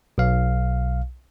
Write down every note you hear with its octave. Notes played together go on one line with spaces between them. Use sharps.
B1 F5